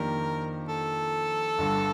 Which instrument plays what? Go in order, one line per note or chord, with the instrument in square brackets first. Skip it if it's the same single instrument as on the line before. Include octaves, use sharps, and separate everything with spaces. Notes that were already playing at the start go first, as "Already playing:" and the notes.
Already playing: [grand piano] F2 D#3 A#3 D4 G4 [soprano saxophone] A#4
[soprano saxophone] A4
[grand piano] G1 G2 D3